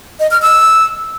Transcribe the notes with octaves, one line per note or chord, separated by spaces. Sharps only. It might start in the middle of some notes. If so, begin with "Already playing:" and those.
D#5
F6
E6